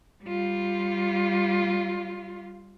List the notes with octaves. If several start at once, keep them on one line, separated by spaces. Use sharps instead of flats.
G3 F4